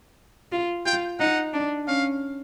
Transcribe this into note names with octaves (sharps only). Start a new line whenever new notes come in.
F4
F4 G5
D#4 F#5
D4
C#4 F5